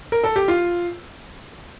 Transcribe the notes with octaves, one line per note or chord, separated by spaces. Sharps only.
A#4
A4
G4
F4